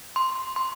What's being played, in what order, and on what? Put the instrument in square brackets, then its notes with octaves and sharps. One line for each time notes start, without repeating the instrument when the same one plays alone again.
[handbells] C6
C6